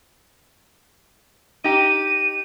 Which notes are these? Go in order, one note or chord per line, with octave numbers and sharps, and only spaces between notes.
D#4 G4 D#7